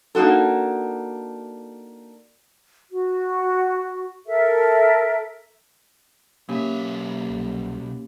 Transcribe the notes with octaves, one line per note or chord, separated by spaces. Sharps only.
A#3 D4 D#4 F#4 A4
F#4
A4 A#4 E5
B1 A#3 C#4 G4 E5
C2